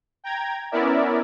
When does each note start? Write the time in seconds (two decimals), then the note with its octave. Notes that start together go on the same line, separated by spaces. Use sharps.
0.24 G5 A#5 G#6
0.72 B3 C#4 E4 A#4 D5 E5